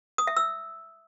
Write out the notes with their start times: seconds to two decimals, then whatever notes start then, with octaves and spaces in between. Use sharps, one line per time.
0.18 D#6
0.27 E5
0.37 E6